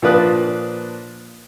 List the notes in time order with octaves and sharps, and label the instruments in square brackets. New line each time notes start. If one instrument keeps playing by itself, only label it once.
[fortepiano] A#2 F3 D4 B4 D#6 F#6